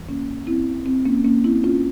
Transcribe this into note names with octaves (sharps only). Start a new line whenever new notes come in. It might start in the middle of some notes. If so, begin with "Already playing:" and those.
Already playing: F2 C#3 E3 G3
A#3 C#4
C4 E4
C4
A#3 C#4
A#3 C#4
C4 E4
C#4 F4